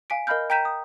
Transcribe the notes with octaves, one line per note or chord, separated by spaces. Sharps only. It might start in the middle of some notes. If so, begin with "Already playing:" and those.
F5 G#5 B6 D7
A#4 D#5 F5 B5 F6 G6
G5 A#5 G6 B6 D#7 E7
D#6